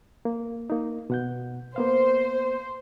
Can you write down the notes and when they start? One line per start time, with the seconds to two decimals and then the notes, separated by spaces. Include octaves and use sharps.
0.25 A#3
0.70 A#3 D#4
1.10 B2 F#5 G6
1.76 A#3 B3 C5 F5